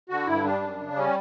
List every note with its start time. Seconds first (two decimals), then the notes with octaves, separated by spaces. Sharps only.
0.09 D3 F#4
0.27 G2 E4
0.44 G3 D4
0.62 F#2
0.80 C#3
0.96 G3 C#4